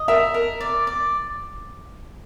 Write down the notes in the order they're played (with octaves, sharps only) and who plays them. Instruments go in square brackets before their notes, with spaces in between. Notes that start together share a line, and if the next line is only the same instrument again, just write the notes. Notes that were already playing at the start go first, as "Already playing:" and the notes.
Already playing: [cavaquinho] D#5
[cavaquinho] A#4 [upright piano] E5
[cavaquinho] A#4
D5
D5